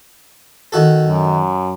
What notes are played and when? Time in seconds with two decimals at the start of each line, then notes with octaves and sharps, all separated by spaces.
0.72 D#3 F#4 A4
1.06 F#2